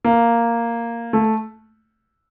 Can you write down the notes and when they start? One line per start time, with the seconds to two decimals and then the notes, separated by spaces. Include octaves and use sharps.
0.04 A#3
1.13 A3